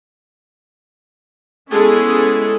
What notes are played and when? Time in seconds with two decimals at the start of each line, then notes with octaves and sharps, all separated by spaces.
1.71 G#3 B3 C#4 E4 G#4 A4